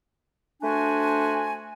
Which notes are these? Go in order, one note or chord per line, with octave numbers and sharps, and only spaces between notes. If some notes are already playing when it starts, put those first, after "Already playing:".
A3 D4 F#4 C5 G#5